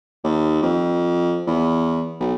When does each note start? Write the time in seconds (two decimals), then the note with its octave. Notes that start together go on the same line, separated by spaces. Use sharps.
0.24 D#2
0.63 F2
1.47 E2
2.20 B1